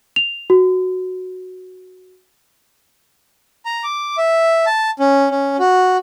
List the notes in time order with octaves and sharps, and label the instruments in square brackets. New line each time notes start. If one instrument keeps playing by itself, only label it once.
[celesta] F7
F#4
[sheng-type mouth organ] A#5
D6
E5
A5
C#4
C#4
F#4